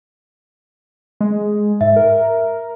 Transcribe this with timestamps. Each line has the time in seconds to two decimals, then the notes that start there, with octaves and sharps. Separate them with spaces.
1.21 G#3
1.81 G#2 E5
1.96 A#4